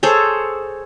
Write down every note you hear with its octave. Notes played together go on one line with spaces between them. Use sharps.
G#4 A4 C5 C#5